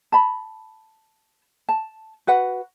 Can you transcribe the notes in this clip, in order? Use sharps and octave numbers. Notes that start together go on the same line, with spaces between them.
A5 B5
A5
F#4 B4 F#5